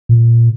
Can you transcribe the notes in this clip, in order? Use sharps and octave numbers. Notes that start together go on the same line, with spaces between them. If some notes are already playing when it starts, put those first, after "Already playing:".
A#2